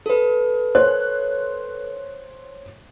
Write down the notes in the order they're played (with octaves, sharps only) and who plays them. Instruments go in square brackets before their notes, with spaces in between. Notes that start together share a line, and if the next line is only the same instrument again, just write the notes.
[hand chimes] A4 B4
[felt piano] C5 C#5 F#6